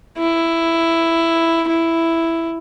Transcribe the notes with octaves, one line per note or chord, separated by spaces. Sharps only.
E4
E4